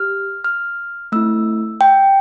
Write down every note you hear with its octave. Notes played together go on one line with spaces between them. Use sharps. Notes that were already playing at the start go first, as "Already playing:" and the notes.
Already playing: G4 F6
F6
A3 C4 E4 E6
G5